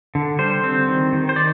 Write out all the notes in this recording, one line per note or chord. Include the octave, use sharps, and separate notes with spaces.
D3
G3 C5
C4
D#3
D#3
C5
D#3 D5